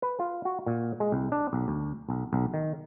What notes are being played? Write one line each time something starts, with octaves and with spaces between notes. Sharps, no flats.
B4
F4
F#4
A#2
G#3
C2
D4
B1
D2
B1
B1
D#3